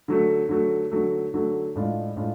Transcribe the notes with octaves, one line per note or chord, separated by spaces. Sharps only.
D3 F#3 A3
D3 F#3 A3
D3 F#3 A3
D3 F#3 A3
A2 G#3 D4 F4
A2 G#3 D4 F4